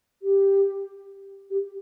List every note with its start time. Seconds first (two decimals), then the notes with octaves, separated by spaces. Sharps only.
0.22 G4
1.50 G4